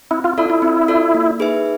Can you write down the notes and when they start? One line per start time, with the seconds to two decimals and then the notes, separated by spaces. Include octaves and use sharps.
0.11 C4 E4
0.24 F4
0.38 E4 F4 A4 D5
0.50 E4
0.62 C4
0.88 F4 A4 D5
1.14 A#3
1.39 D#4 G#4 B4 E5